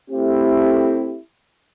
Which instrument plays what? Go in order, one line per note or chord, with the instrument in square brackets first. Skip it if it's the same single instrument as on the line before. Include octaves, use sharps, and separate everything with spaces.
[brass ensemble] A3 C4 E4 G4